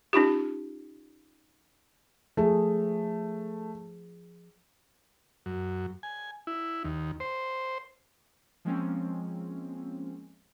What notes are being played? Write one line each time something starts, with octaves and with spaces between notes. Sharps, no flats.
C#4 D#4 F4 G4
F3 A3 G#4
F#2
G#5
E4
D#2
C5
F3 G#3 A#3 C4 C#4